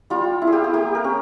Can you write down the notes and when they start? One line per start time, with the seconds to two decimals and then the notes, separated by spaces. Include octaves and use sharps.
0.10 G3 F4
0.42 E4
0.47 G#4
0.52 G4
0.64 G#4
0.73 A#3 G4
0.95 A#4
1.04 C#4